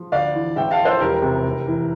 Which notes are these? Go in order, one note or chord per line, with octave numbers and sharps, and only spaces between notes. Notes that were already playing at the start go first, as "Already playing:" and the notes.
Already playing: F3
D2 D5 F5
E3
A1 E5 G5
F5 A5
F3
A4 C5
E1 G4 A#4
C3
F1
E3